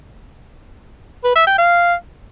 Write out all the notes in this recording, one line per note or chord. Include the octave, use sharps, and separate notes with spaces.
B4
E5
G5
F5